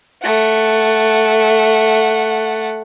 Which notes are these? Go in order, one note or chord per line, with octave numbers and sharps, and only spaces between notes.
A3 F#5